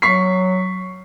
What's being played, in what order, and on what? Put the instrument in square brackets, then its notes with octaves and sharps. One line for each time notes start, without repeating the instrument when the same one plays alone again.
[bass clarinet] F#3 [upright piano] C#6 B6 C7